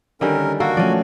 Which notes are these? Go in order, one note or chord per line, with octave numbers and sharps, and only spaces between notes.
D3 D#3 G3 C#4 A#4
A#3 F#4 A4
F3 F#3 A3 C#4 D5